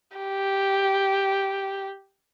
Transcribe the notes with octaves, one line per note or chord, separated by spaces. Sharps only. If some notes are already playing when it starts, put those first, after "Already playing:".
G4